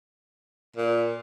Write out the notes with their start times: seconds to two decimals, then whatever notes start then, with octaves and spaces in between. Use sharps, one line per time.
0.76 A#2